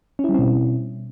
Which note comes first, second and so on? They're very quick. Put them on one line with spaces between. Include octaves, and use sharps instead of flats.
C#4 E4 G3 C4 B2